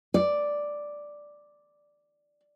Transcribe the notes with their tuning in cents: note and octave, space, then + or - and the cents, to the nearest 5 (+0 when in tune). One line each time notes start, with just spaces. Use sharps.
D5 +0